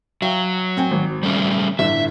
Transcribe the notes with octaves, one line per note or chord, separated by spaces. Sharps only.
F#3 E5 F5 G5
C4 G5 G#5
G#1
G3 A3 C#4
G1 A2 D3 E5